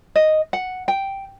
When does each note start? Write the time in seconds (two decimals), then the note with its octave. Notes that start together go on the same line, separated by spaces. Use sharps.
0.16 D#5
0.53 F#5
0.88 G5